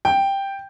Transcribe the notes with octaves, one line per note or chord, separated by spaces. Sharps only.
G5